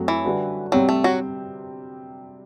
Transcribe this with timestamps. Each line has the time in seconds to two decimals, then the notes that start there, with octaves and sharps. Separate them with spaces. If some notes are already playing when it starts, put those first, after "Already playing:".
Already playing: F#2 F#3 A3 C4 F#4
0.08 E3
0.25 D3 G3 D4 F#4 B4
0.72 C3 F#3 G3 C4 G4
0.89 A3
1.04 F#3 F#4